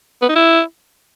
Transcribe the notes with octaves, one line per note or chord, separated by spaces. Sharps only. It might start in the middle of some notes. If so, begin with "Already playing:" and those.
B3
D#4
E4